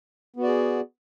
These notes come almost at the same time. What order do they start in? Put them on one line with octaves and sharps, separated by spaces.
B3 F#4 D5 G#4